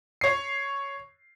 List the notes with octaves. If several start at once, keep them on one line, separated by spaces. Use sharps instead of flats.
C#5 C7